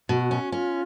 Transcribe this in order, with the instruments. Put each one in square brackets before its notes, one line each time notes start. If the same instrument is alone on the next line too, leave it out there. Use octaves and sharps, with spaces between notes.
[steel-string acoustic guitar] B2 [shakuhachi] F#4
[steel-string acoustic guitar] C#4
[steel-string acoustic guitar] C#4 [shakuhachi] F4